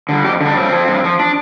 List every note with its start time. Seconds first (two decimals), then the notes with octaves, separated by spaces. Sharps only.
0.09 D3 G3
0.25 F2 G4
0.41 D3 G3 D4
0.56 G2 C4
0.72 F3
0.88 G2
1.04 F3
1.19 D4